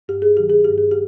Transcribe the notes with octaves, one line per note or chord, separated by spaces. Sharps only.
G2 G4
G#4
D#3 F#3 G4
G#4
G2 G4
G#4
G4